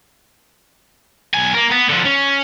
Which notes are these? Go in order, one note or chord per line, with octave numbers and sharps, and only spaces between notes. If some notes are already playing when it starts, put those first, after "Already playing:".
B1 G#5
A#3 A#4
B3
D3 F3
C#4